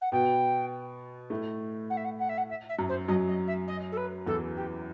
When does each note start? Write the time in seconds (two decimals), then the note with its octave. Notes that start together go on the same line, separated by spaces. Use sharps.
0.01 F#5
0.12 B2 B3 G5
1.30 A2 A3
1.90 F#5
1.97 E5
2.04 F#5
2.19 F#5
2.29 E5
2.37 F#5
2.49 E5
2.69 E5
2.79 F#2 F#3
2.89 C5
3.08 F#2 F#3 D#5
3.28 D#5
3.47 E5
3.67 D#5
3.92 A4
3.97 B4
4.26 E2 E3 A4
4.56 G4